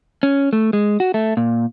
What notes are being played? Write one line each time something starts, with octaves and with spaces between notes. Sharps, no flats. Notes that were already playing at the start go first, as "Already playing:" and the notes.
C#4
A3
G#3
F#4
A3
A#2